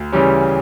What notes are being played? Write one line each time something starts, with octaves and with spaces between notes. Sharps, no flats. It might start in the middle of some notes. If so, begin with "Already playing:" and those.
Already playing: D2
C#3 E3 G3 C#4